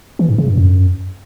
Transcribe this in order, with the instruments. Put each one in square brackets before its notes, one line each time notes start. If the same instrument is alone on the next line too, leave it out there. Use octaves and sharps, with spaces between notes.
[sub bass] E3
G#2
C#3
G2
F#2